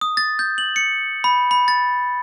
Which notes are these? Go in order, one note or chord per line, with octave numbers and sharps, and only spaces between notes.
D#6
A6
G6
F#7
C#7
B5
B5
A6